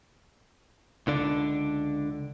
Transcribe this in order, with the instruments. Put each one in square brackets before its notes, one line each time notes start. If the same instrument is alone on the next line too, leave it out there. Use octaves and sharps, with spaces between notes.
[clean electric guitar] C#2 D3 D4